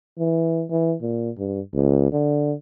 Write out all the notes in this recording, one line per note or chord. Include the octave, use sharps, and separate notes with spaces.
E3
E3
A#2
G2
C#2
D3